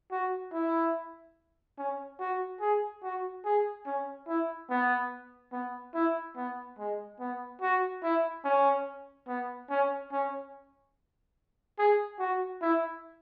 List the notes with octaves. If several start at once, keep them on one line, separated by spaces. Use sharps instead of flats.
F#4
E4
C#4
F#4
G#4
F#4
G#4
C#4
E4
B3
B3
E4
B3
G#3
B3
F#4
E4
C#4
B3
C#4
C#4
G#4
F#4
E4